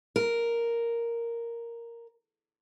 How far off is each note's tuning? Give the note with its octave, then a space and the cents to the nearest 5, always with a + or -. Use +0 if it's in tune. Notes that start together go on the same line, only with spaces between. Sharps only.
A#4 +0